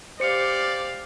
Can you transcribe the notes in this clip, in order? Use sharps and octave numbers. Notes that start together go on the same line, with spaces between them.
G4 C5 D5 F5 C#7